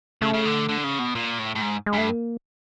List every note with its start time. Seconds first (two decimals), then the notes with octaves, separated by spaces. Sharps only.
0.22 C#3 A3
0.33 C#3
0.45 D3
0.69 D3
0.84 C#3
0.99 B2
1.15 A#2
1.39 A2
1.56 A2
1.62 G#2
1.86 G#3
1.94 G2 A3
2.09 A#3